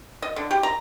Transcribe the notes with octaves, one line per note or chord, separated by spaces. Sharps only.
D#5
D3
G4
A#5